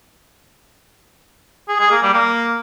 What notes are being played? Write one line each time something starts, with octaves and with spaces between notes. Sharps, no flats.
G#4
G#4
A#3
G3
A#3